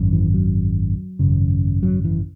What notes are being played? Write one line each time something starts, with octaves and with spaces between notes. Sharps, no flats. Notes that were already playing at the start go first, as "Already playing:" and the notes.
Already playing: G#1 F#2
E3
F#3
G#1 F#2 C#3
F#3
E3